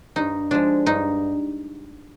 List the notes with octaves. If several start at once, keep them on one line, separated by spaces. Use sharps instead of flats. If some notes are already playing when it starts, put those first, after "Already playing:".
G2 D#4
F3 G#3 D4
G2 D#4